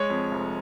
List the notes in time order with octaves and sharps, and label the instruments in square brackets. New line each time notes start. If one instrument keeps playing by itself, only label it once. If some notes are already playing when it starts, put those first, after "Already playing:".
Already playing: [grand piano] G#3 [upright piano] C#5
[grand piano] F2
F1